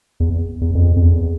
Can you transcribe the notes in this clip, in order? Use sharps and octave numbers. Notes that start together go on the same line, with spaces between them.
E2
E2
F2
F2
E2